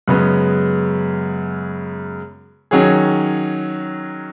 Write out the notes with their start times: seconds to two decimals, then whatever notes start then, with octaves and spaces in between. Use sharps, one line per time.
0.08 F#2 C#3 G#3 B3
2.71 D#3 F#3 C#4 G#4